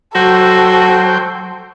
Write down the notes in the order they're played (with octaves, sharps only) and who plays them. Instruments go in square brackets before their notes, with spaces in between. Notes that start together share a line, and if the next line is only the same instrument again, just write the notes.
[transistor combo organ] F#3 C5 G5 [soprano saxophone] F#4 [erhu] A4